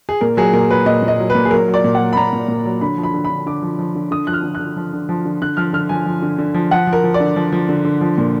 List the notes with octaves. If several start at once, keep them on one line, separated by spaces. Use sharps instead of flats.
G#4
A#2 A#4
F#3 G#4
A#2 A#4
F#3 B4
A#2 D#5
A#2
D#5
F#3
B4
A#2
G#4
F#3 A#4
F#3
D5
A#2
F#3 F#5
B5
A#2 A#5
A#2
A#2
F#3
D3 B5
F3
B5
D3
B5
D3
D3 D6
F3
F3
D3
D3 D#6
F3 F#6
F6
D3
D3 F#6
F3
D3
F3
D3
D3 F#6
F3 F6
D3 F6
F3 G#5
F3
D3
D3
F3
F3 F#5
F3
A#4
F3
D5
D3
F3
F3
D3
D3
F3
A#2